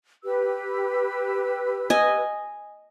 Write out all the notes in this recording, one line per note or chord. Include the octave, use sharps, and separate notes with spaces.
G4 B4 E6
D#5 G#5